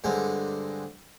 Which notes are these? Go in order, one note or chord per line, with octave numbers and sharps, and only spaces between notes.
G2 D3 G#3 C4